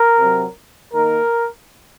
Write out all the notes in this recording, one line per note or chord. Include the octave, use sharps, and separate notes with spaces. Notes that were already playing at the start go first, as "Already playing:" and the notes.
Already playing: A#4
C3 F#3 C4
D#3 A#3 A#4